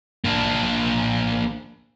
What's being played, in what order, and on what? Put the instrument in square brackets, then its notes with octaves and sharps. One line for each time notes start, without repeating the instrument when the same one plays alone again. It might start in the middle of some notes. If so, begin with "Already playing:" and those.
[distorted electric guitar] A#3 D4